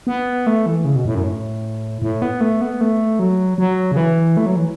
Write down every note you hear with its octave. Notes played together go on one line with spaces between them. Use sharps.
B3
A3
E3
C#3
B2
A2
F#2
A2
A2
B3
A3
B3
A3
F#3
F#3
C#3
E3
A3
F#3
E3